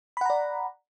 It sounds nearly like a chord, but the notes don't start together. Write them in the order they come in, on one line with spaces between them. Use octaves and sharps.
B5 F#5 A#5 D5